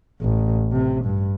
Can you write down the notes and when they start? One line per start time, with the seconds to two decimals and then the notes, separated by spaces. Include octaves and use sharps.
0.22 A1
0.72 C3
1.05 G2